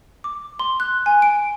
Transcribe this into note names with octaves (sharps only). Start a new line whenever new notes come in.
D6
C6
F#6
G#5
D7